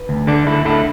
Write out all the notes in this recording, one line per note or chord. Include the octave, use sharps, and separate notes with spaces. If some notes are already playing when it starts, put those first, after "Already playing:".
Already playing: B4
D2
D3 A4 D5
D2 E4 A4
D3 E4 A4